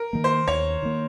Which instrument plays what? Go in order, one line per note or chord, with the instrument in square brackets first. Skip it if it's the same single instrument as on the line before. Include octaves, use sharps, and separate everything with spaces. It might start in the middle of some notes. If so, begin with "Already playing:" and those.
Already playing: [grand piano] A#4
[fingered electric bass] D#3 A#3
[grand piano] C5
[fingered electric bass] D#2 [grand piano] C#5
[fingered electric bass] D#3 A#3